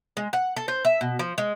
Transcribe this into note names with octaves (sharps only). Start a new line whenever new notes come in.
G#3
F#5
A4
C5
E5
B2
F3
G#3